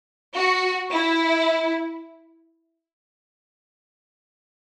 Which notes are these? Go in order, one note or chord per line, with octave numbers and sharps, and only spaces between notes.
F#4
E4